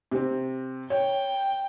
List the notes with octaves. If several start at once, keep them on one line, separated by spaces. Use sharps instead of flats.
C3 C4
C#5 G5